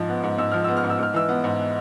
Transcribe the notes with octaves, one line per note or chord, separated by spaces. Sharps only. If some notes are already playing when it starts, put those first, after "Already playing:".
Already playing: G#2 F3
B3
G#2
G#2 E6
F3 F6
B3 E6
F6
G#2
E6
G#2 F6
E3 E6
B3
G#2